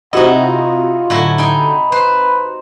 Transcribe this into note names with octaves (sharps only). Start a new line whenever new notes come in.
C3 D#4 E4 F#4 D#5 F#5
F4
A2 D3 F#3 E4
D#4 G5 G#5 B5
B4 C5